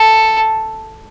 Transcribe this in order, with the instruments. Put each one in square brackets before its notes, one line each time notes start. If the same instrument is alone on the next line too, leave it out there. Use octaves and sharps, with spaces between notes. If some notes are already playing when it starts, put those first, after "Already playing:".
Already playing: [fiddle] A4